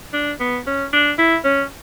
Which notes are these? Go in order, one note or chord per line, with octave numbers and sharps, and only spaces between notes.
D4
B3
C#4
D4
E4
C#4